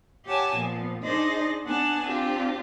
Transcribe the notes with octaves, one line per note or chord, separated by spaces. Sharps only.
G4 C#5 F#5 G#5 A5
A#2 F3 B3
D4 D#4 G#4 C5 D5 D#5
B3 D4 F#5 G#5 A5
C4 D4 F4 G4